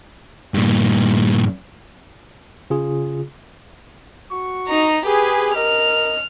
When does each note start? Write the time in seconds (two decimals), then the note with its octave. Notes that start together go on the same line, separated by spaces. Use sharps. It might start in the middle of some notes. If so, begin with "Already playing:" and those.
0.54 G2 A#2
2.70 C#3 F4 G#4
4.31 F#4 C#6
4.68 D#4 A#5
5.06 G4 G#4 B4
5.54 A#4 D#5 F6